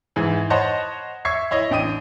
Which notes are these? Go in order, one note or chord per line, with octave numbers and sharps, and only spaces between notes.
G#2 E3
C5 C#5 D#5 F#5 A5 B5
E5 C#6 G#6 C7
E4 C#5 D#5
A1 D4 G5 D#6 D#7